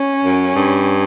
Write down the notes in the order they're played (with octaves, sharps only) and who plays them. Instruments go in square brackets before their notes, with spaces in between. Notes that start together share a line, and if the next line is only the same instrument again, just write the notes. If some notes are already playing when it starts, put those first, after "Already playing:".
Already playing: [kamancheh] C#4
[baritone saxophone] F#2
G2